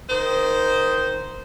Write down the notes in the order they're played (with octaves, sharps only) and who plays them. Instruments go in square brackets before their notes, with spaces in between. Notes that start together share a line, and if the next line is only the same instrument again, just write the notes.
[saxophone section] D#3 C5